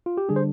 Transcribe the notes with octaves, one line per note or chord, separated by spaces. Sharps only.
F4
G4
D3 G3 D4 G#4
C5